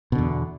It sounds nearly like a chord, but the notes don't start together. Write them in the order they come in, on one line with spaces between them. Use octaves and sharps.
B2 D3 E2